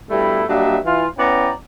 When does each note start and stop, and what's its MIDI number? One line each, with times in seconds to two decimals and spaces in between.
0.11 0.42 43
0.11 0.42 47
0.11 0.42 55
0.11 0.42 57
0.11 0.42 64
0.48 0.77 54
0.48 0.77 55
0.48 0.77 58
0.48 0.77 62
0.48 0.77 75
0.48 0.77 76
0.84 1.06 52
0.84 1.06 65
1.18 1.50 59
1.18 1.50 61
1.18 1.50 64
1.18 1.50 74
1.18 1.50 79
1.18 1.50 82